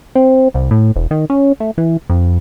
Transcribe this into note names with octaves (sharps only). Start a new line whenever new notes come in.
C4
C2
A2
E1
D#3
C#4
A3
E3
F2